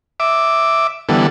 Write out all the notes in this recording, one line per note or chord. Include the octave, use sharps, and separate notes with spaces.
E5 D6
D3 E3 G3 B3 A4